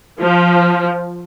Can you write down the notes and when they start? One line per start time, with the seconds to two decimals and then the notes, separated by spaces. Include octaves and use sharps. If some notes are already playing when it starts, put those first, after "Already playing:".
0.20 F3